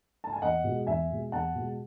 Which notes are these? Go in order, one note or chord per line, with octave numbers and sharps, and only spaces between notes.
A5
G#5
E2 D#5 F#5
B2 G#3
E2 E5 G#5
B2 G#3
E2 F#5 A5
B2 G#3